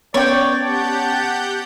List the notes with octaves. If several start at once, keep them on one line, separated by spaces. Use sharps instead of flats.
B3 C#4 C#5 D5 G5
G4 F#5 A5 G6